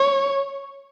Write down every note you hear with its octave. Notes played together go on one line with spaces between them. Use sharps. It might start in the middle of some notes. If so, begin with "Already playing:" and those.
Already playing: C#5